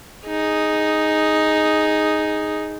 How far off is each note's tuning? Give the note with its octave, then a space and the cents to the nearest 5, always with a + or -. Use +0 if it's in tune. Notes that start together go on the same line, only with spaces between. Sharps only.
D#4 +0 G#4 +0